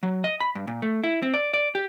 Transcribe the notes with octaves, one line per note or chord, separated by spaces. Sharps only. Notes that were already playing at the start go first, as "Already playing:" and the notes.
F#3
D#5
B5
G2
A#2
A3
E4
C4
D5
D5
G4